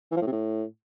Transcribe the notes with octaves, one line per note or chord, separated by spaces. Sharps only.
E3
F3
A2
C3
A2